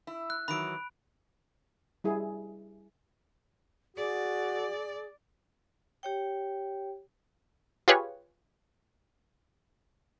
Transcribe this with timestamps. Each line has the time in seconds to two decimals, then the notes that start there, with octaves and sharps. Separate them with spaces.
0.07 E4
0.30 F#6
0.48 D#3 E3 F#3 B5 D7
2.04 G3 E4 G#4
3.97 F#4 G#4 D5
6.03 G4 C#5 G5
7.88 F4 G4 G#4 B4 C#5